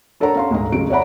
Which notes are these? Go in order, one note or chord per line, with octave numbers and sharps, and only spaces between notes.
D4 A4 A#4 C#5 F#5 A#5
C#4 F5 C6
D2 G#2 A#5
F2 C#3 F#3 D7
C#5 D5 E5 F#5 A#5 B5